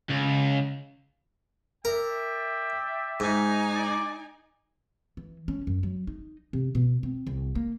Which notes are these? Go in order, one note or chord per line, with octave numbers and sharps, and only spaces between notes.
C#2
A#4 D5 E5 G5
G#2 D#4 G#5
D5
E3
C#4
F#2
F#3
D#4
C3
B2
C4
C2
A#3